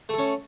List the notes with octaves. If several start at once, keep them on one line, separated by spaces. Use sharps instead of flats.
A3 C#4 A4